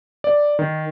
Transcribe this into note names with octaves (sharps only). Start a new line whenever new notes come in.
D5
D#3